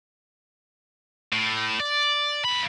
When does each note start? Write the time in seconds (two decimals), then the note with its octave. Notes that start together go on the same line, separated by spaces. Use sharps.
1.33 A2
1.80 D5
2.45 F2 B5